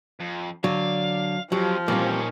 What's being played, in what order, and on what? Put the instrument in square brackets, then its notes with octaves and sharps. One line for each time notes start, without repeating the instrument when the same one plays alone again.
[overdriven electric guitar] F2
[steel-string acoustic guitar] D3 D5 [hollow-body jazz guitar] F#3 [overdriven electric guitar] F5
[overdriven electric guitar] F2 [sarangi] F3 [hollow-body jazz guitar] F#3 [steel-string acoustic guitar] G4
[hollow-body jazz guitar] A#2 A#3 [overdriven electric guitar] D#3 C#4 [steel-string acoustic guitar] E3 G3 C4